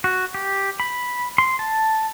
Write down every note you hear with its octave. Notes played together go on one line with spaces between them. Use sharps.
F#4
G4
B5
C6
A5